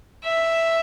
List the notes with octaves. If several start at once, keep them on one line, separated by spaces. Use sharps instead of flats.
E5